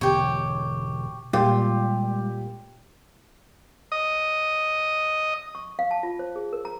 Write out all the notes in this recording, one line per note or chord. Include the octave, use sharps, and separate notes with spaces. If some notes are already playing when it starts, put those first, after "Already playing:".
E1 B2 D3 G4 C#5
A#2 G3 G#3 F4 G4
D#5
C#6
F5
A5
F4
C5
G#4
A#4
A#5